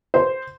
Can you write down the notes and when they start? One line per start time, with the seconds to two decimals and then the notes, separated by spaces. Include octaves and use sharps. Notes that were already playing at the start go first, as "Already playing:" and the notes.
0.14 C5